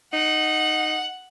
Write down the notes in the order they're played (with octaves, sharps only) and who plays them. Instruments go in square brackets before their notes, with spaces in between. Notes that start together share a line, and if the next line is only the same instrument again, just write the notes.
[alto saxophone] D#4 [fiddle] F#5